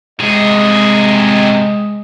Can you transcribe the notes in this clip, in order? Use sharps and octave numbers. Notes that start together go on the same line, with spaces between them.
C3 G#3 G#4 D#5